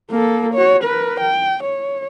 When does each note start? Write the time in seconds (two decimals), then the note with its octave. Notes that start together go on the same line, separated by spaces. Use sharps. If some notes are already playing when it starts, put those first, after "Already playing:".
0.11 A#3 A4
0.54 F#4 C#5
0.84 A#4 B4
1.20 G5
1.63 C#5